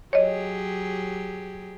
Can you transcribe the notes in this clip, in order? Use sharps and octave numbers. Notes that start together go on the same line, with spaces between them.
F#3 G4 G#4 C#5 D#5